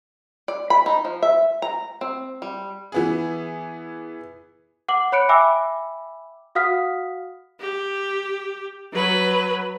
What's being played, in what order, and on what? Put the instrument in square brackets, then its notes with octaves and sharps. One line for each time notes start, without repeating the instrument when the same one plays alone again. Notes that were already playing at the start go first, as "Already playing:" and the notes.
[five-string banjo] D5
B5
D#4
F3
E5
A#5
C4
G3
[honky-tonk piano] E3 B3 G#4
[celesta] F#5 D6 F#7
C#5 B5 F#6 C#7 D7
E5 G5 G#5 B5 D6 E6
F#4 F5 F#5 D#6 F6 B6
[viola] G4
F#3 B4